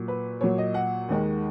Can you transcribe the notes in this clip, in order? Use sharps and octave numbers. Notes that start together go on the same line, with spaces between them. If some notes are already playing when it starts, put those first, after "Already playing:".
Already playing: A#2 F#3
B4
A#2 F#3 C#5
D#5
F#5
D#2 D#3 G#3